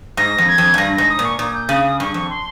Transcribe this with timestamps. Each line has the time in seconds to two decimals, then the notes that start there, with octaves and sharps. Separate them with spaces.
0.17 G#2 A#6
0.38 F2
0.48 G#6
0.58 F2
0.74 G#2
0.78 G2 A#6
0.94 G#2 A#6
1.09 D#6
1.19 A#2
1.24 C#6
1.38 A#2 D#6
1.54 G6
1.69 C#3 D#6
1.85 D#6
2.00 G2 C#6
2.14 F2 C#6
2.30 C6